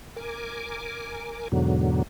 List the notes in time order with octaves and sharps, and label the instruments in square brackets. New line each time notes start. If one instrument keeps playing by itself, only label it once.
[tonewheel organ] A#4 G#5 D6
E2 G#2 B2 D3 F#3